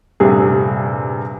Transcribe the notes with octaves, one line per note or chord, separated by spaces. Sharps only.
D#1 G2 C3 A3 G#4